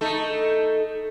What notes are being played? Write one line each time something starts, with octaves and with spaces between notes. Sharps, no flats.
A3 D#4 A4